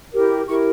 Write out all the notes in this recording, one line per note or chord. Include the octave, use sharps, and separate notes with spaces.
E4 G4 A#4
E4 G4 A#4 C#6